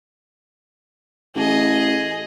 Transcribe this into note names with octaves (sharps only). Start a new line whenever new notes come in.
A1 G#4 D#5